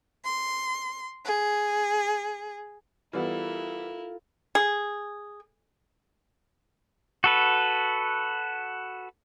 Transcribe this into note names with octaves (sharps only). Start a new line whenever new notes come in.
C6
G#4
E3 G3 B3 E4 F4 A4 A#4 F5
G#4
F#4 A4 B4